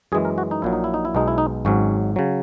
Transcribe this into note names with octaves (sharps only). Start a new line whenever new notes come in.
F#2 E3 G#3 G#4
A#4
F#4
D#4
A#1 A#2 F#3 E4
D#4
E4
D#4
E4
B1 B2 G#3 D#4
E4
D#4
G#1 G#2 F#3 C#4
C#3 F#3